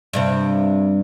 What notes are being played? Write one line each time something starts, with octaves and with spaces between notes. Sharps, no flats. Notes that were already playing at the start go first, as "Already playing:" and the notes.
G2 C3 C4